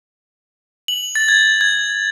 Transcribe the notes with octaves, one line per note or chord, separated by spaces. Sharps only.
F#7
A6
G#6
G#6